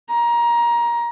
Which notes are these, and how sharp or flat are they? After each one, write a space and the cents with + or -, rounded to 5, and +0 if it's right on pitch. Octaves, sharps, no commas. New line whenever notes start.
A#5 +20